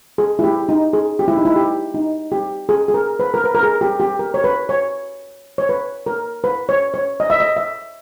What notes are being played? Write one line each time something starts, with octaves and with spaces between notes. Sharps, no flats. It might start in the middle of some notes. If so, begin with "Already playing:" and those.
G#4
E4
G4
D#4
G#4
G4
E4
D#4
E4
G4
D#4
G4
G#4
G#4
A#4
B4
A#4
B4
A#4
G#4
G4
G4
A#4
C#5
B4
C#5
C#5
B4
A#4
B4
C#5
C#5
D#5
E5
D#5
E5